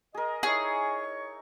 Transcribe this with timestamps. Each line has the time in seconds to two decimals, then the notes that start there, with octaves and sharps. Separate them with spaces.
0.14 G#4 A#4 D#5
0.43 D#4 E4 G#4 C#5 C#6